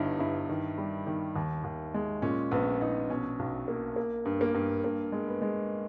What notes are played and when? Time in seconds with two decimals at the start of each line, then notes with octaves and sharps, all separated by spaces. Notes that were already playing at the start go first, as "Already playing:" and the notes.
Already playing: G1 G2 D#4 E4
0.19 G2 E4
0.49 D#3
0.78 G3
1.07 D#3
1.36 D#2
1.64 D#2
1.94 G#3
2.22 A#2 C#4
2.51 A#1 B3
2.81 A#1 D#4
3.10 B2 C#4
3.39 B1
3.68 A#3
3.96 A#3
4.25 G2
4.41 A#3
4.54 G2
4.84 G2 A#3
5.12 G#3
5.28 B3
5.42 G#3